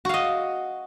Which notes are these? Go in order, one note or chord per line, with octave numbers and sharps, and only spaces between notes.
F#4 D#5 F5